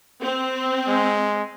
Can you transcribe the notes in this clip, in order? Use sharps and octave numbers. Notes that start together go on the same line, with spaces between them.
C4
G#3